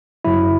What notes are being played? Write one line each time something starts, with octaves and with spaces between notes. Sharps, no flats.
F#2 C#3 F#3 E4